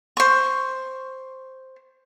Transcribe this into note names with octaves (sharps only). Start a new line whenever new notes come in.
C5 C#6